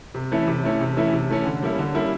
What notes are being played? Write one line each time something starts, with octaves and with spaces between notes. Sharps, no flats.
C3
E3 A3 C#4 E4
C3
E3 A3 C#4 E4
C3
E3 A3 C#4 E4
C3
E3 A3 C#4 E4
D3
G3 A#3 C#4 E4
D3
G3 A#3 C#4 E4